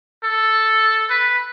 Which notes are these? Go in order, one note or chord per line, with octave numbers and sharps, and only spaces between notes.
A4
B4